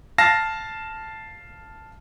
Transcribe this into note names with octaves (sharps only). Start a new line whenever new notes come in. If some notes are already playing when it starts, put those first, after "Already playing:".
F5 A5 A#6